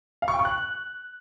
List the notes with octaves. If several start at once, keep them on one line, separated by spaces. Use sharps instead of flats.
F5
C#6
G5
C#6
F#6